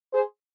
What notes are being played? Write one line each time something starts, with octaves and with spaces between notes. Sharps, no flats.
G#4 C5